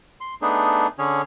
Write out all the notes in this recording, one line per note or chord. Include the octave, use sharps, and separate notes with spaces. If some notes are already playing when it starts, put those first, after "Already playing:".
C6
A3 B3 D4 D#4 G#4
D3 C#4 G#4 C#5